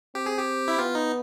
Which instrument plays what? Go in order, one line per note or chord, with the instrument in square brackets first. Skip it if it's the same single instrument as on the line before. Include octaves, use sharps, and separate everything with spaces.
[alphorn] C4 [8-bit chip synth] G4
[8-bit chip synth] G#4
G4
E4
[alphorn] B3 [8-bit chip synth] F4
[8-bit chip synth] D#4